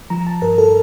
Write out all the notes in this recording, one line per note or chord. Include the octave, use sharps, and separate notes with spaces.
F3 A#5
A5
G2 A#4
A4